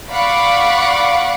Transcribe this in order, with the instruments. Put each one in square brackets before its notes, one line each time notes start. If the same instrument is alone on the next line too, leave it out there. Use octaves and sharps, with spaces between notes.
[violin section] D5 F5 F#5 B5 C#6 D6